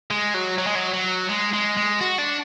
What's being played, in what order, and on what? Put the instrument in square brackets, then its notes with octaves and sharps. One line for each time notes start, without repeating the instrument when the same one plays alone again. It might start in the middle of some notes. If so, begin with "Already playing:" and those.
[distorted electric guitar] G#3
F#3
F#3
G#3
F#3
F#3
G#3
G#3
G#3
F#4
D4